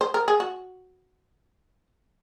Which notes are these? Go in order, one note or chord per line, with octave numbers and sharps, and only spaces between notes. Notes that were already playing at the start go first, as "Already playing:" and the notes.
C5
A#4
G#4
F#4